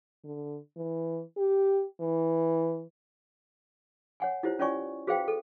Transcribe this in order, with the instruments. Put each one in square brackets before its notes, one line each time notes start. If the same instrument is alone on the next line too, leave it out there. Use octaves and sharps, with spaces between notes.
[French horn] D3
E3
G4
E3
[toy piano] C#5 F#5 G#5
E4 F4 G4 C5 C#5
C#4 F4 C#5 D5 G#5 C#6
F#4 G#4 B4 C5 F5 G5
A4